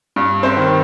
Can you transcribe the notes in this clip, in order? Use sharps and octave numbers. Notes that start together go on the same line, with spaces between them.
G2
C4 C5
D#3